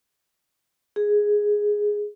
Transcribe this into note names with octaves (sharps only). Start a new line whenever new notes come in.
G#4